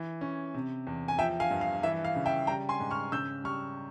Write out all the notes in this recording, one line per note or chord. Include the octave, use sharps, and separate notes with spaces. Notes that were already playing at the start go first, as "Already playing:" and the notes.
Already playing: E3
C#4
C3
E2
G#5
F3 E5 G5
F5 G#5
G2
F5
E3 E5
F5
C#3
E5 G5
G3 G5 A#5
G#5 C6
G#2
C#6 F6
C#3 E6 G6
G3 C#6 F6